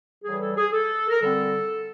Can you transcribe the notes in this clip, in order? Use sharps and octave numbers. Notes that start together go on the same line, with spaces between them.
A2 E3 G3 G#4
A4
G#4
A4
A#4
D3 G3 C4 A4